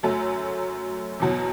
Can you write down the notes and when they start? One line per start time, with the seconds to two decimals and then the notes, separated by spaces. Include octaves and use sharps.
0.03 F#2 F#3 A3
1.20 E2 B2 F#3